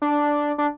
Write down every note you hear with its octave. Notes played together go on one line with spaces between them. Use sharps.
D4
D4